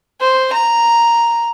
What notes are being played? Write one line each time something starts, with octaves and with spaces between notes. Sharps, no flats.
C5
A#5